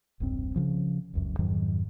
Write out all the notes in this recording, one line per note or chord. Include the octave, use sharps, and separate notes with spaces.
E1 C2 G2 C4
C#3 F3
F1 C#2 F#2
F2 G#2 D#3 F#3